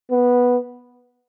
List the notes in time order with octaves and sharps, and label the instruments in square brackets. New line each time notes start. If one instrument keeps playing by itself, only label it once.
[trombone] B3